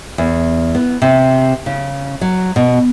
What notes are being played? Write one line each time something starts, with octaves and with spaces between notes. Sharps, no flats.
E2
B3
C3
C#3
F#3
B2